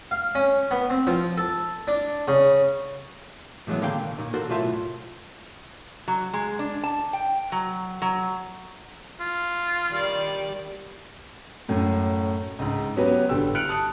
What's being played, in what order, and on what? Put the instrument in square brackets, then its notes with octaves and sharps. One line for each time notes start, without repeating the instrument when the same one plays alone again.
[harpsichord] F5
C#4
B3
C4
F3
A4
D4
C#3
[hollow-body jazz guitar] A2 E3 F#3 G#3 B3
C#2 D3 D#3 A#3 F5 G5
A#2
A#2 D#3
F#4 A4 A#4 C5
B1 A2 F4 C5 E5 A5
[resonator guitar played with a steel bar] F#3
G#3
D4
A5
G5
F#3
F#3
[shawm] F4
[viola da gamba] D#3 G3 D5
[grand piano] F#2 A2
C#2 G#2
F#3 B3 C#4 F#4 G4 B4
G1 G3 G5 E6
F6 F#6 C#7 D7 F7 F#7
A5 D#6 F#6 C#7